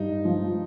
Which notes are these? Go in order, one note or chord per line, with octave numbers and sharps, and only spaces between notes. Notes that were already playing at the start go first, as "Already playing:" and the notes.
Already playing: G2 D#4
F3